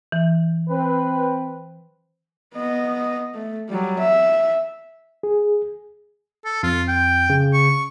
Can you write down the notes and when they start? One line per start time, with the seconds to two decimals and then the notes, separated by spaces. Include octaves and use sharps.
0.12 E3
0.69 C4 B4
2.55 B3 D#5
3.34 A3
3.69 F#3 G3
3.99 E5
5.23 G#4
6.45 A4
6.63 F2 F4
6.88 G5
7.30 C#3
7.53 C#6